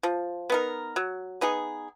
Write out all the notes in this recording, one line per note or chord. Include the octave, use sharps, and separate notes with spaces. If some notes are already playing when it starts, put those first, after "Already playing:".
F3
B3 D#4 A#4
F#3
B3 D#4 G#4